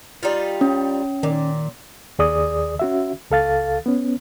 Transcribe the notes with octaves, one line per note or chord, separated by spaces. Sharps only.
G3 D#4 F4
C#4
A#2 D#3
D#2 G#4 D5 D#6
C#4 F#4 E5
C#2 A4 F5 A6
B3 C#4